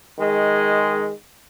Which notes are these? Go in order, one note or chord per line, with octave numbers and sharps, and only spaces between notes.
D#3 G#3